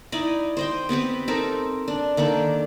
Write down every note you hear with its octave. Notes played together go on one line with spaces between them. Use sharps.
D#4 E4 D5 D#5
C5 D#5 G5
B3 C4 G4 B4
C4 D#4 A4 A#4
D4
D#3 A#3 D4 A4